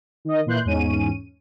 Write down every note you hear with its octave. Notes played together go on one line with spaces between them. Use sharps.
D#3 D#5
A#2 E3 C6 F#6 G6
E2 G#2 C#4 D#7